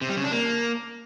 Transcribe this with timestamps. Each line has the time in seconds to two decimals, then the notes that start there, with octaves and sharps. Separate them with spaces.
0.01 C3
0.09 G3
0.17 C#3
0.24 D4
0.32 A#3